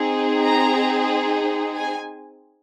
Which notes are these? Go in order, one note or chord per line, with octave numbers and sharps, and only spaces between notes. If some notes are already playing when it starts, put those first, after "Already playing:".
Already playing: C4 D#4 G#4
A#5
G#5